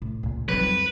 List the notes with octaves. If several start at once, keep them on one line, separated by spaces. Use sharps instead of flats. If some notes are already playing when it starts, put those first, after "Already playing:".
A2
C#2 A#2 C#3
F2 F#3 G3 D#4 B4